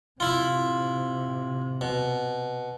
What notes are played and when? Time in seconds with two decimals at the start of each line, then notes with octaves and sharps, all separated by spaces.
0.20 C3 E4 F4
1.81 B2